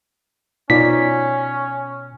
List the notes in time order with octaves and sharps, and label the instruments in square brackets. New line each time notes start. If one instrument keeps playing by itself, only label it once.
[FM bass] B2 [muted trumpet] C#4 [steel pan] D#4 F4 D5 [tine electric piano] B6